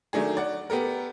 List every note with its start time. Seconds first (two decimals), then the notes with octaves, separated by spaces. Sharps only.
0.13 D#3 F#3 A3 D4 G#4
0.37 D5 F#5
0.70 B3 G4 A4 A#4